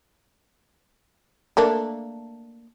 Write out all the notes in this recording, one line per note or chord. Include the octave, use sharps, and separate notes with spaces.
A3 A#3 D4